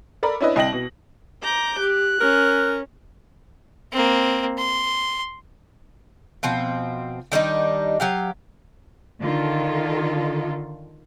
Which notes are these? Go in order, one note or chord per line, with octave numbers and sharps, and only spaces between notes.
A4 A#4 D5 A#5 B5
C#4 D4 E4 B4 D#5
C2 D#5 G5 A#6 F#7
B2
A#5 D6 G6
G4 F#6
C#4 A#4
A#3 C4
C6
B2 F3 C4
D#3 G3 D4 D#4
F#3 G4 F5
D3 D#3 F4 A4